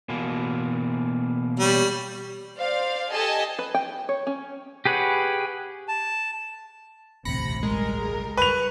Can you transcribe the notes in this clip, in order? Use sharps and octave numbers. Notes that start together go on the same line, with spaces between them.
B2 E3 A#3
G3 C#5
C5 D5 F5
G4 A4 D#5 G#5 A5
B4
G5
C#5
C#4
G4 G#4 B4 C#5 F#5
A5
E1 A1 D2 C3 B5 A#6 C#7
C#2 G3 G#3 A#4
B4 C#6 F7